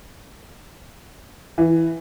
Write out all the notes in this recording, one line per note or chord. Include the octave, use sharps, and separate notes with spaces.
E3